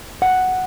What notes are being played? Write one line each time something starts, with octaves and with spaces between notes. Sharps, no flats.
F#5